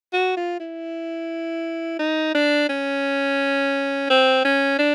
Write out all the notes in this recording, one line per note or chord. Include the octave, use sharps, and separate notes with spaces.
F#4
F4
E4
D#4
D4
C#4
C4
C#4
D4